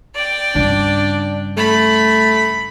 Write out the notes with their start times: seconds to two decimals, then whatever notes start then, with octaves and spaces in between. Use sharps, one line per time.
0.15 D5 G5
0.55 G2 C#3 D4
1.57 A3 B5